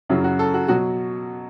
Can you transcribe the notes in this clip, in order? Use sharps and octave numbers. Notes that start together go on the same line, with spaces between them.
F#2 C#3 F#3 E4
F#4
A4
F#4
B2 F#3 F#4